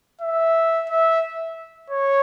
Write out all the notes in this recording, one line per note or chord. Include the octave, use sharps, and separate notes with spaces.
E5
E5
C#5